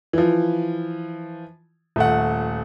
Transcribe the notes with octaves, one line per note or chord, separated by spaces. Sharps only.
E3 F3
D#1 A3 F#5